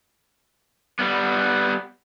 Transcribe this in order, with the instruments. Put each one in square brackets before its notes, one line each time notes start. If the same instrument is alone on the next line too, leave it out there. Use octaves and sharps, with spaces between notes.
[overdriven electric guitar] G3 B3